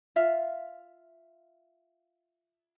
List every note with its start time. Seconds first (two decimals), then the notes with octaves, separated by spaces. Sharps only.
0.16 F4 E5 F5